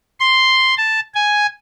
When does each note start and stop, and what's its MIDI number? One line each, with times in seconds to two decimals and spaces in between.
0.20 0.75 84
0.77 1.00 81
1.15 1.46 80